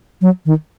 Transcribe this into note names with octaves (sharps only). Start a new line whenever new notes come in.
F#3
D#3